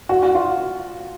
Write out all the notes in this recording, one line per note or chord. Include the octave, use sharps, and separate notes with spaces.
F#4
F#4
F4